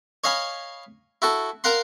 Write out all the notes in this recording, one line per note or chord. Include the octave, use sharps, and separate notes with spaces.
C#5 D#5 F5 G#5 B5
E4 F#4 A4
A#4 F5 F#5 A#5 C6